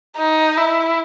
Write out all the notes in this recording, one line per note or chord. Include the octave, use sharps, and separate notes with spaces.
D#4
E4